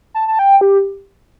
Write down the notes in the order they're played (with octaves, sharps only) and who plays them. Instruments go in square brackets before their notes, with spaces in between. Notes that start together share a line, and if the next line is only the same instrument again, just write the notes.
[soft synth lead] A5
A5
G5
G4